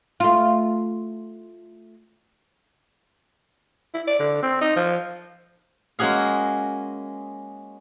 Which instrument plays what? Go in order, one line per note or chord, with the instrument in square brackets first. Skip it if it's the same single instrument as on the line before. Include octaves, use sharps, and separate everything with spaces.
[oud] A3 F4
[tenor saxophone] E4
D5
D3
C4
D#4
F3
[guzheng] G#3 A#3 C#4 F#4 G#4 F5